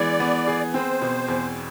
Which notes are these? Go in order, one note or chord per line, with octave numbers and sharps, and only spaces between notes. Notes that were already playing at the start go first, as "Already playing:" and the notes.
Already playing: E3 G#3 B3 D5
B3
G#4
C4 C5
B2
E2